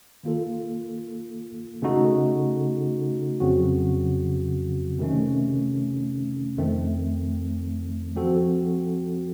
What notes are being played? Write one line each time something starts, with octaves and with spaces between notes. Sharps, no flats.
D#3 A#3 F4 A4
C#3 A3 D#4 F#4 A4
F2 C#3 F#3 C4 F#4
C3 D#3 A3 C#4
F2 D#3 A3 C4
F3 C4 F#4 A4